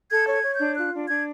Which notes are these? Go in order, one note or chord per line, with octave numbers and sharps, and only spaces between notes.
A4 G#6
C#5
G#6
C#5
G6
D4
F4 F#6
D4
D4 G#6